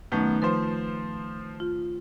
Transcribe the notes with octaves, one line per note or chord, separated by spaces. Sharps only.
F#2 D#3 A3 B3 D#4 G6
F3 B4 C5
F4